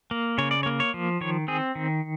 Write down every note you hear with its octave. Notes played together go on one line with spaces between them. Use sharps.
A#3
C#3 C#5
D5
C#5
A#3
C#5
F3
D#3 C#5
C4 G#4
D#3